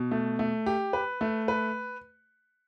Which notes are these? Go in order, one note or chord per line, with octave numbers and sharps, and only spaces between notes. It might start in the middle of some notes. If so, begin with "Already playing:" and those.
Already playing: B2
A3
A3
G4
B4
A3
B4